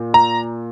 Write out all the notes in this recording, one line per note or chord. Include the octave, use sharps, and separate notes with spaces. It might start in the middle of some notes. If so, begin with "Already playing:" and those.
Already playing: A#2
A#5